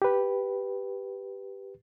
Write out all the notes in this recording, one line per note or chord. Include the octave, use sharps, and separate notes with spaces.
G4 B4